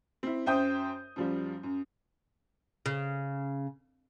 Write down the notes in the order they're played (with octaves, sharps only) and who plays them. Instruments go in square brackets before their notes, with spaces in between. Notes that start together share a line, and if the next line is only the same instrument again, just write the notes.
[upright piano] C4 E4
F#2 C5 E5 G5 D#6 G6
F#2 F3 G3
F#2
[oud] C#3